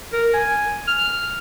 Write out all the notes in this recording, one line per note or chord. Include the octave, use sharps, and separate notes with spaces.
A#4
G#5
F6